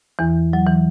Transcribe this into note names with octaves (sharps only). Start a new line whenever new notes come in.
E2 E3
F#3
E3